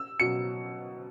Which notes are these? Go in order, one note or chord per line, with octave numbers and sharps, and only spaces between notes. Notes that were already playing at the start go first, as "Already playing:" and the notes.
Already playing: E6
B2 F#3 C#7